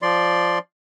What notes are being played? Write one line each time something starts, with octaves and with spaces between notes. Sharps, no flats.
F3 D5 C6